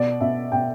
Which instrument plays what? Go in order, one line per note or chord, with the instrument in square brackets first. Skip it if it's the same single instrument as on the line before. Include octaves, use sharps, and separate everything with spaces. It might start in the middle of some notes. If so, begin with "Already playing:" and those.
Already playing: [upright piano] B2 D5
B2 E5
B2 G5